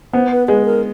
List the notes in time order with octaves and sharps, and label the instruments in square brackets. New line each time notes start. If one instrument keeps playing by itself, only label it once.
[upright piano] B3 [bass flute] C5
[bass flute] B4
[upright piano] G#3 [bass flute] B4
[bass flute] A#4